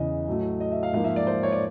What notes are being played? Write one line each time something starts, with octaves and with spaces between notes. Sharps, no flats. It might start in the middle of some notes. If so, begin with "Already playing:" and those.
Already playing: E2 C#3 E3 D#5
A2 F#3 A3
D#5
E5
F5
G#2 F3 A#3 F5
E5
D5
C5
C#5
D5